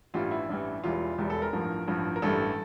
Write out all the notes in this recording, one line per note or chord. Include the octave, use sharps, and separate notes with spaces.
A1 G2 E3 G3 F4
E4
A1 G2 E3 G3
E1 E2 E3 G3 F4
E1 E2 E3 G3
A4
A#4
A1 G2 F3
A1 G2 F3
A#4
A1 G2 E3 G3 A4